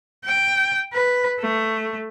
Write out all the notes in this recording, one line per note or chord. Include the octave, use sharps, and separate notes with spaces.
G5
B4
A3